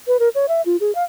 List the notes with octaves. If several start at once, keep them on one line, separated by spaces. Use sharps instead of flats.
B4
A#4
C#5
E5
F4
G#4
F5